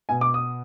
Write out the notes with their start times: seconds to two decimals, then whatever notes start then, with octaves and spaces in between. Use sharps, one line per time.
0.09 B2 G#5
0.21 D6
0.34 D#6